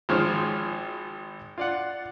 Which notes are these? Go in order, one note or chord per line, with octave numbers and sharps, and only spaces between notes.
G#1 F3 G#3 C5 C#5 F6
F4 D5 F#5